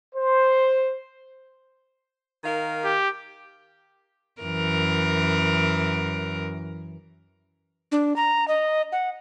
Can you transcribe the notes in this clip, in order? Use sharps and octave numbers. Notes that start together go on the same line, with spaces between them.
C5
D#3 A#4 F5
G4
F#2 E3 A#4
D4
A#5
D#5
F#5